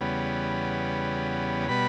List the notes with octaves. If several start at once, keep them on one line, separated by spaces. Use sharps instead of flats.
E2 C#3 G3 B3
B2 G3 B3 B5